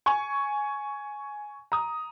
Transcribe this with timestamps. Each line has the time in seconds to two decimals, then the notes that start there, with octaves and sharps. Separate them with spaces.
0.06 G#5 C#6
1.72 A#5 D#6